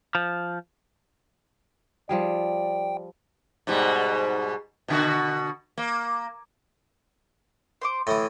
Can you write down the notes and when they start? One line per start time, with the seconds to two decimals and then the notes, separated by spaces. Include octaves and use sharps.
0.15 F3
2.09 F3 G3 G#4 D5 G5
3.67 G#2 B2 G3
4.88 B2 D3 F#4
5.78 A#3
7.82 C5 C6 D6
8.07 A2 E3 C6 D#6